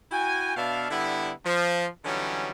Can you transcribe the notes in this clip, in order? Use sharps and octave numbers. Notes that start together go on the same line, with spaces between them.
E4 F#4 G5 G#5
B2 B3 D4 E5 F5
D3 G3 B3 E4
F3
D3 E3 F#3 G3 C#4 D#4